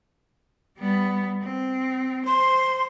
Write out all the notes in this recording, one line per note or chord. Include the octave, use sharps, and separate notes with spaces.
G3 B3
C4
C5 C6